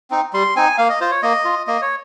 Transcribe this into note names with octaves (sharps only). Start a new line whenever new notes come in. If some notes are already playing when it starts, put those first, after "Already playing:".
C4 D#4
G3 C6
C4 D#4 G#5
A#3 F5
D#5
F4 C5
C#5
A#3 D#5
F4
A#3 D#5
C#5